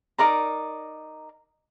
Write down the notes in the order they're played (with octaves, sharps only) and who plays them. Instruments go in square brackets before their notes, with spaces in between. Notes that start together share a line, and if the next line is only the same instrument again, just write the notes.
[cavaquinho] D#4 A#4 D5 A#5